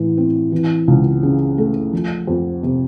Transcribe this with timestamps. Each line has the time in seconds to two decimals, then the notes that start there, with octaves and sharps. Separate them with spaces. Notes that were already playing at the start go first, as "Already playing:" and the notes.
Already playing: A2 E3
0.17 C4
0.52 E3
0.88 C#2
1.23 C#3
1.58 A3
1.93 F3
2.27 F2
2.63 C3